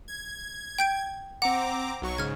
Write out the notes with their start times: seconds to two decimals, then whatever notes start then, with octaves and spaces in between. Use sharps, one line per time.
0.08 G#6
0.79 G5 G6 D7
1.42 C4 F#5 A#5 D6
2.02 B1 F#3 C#6
2.18 G#2 C#3 F6 G#6